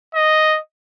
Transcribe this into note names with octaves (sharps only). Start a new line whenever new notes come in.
D#5